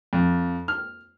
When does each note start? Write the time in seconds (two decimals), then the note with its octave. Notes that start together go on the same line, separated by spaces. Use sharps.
0.13 F2
0.68 F6